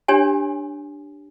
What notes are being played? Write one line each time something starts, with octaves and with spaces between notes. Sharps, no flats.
D4 G4 C#5 G#5